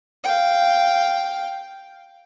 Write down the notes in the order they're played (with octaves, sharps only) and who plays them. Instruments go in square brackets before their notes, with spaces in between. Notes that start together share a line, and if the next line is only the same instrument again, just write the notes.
[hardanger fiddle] F5 G5